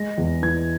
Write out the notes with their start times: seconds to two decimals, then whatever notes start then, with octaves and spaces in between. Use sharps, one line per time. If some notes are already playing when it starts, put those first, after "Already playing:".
Already playing: G#3 A#6
0.18 E2
0.43 E3 G#6